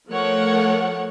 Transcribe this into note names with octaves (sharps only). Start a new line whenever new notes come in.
F3 A3 A4 A#4 C#5 F#5